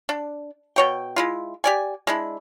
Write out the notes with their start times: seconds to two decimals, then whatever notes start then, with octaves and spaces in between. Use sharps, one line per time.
0.09 D4
0.76 B2 C#5 G5
1.16 G#3 E4 F4
1.64 G4 D5 G#5
2.07 G#3 D4 E4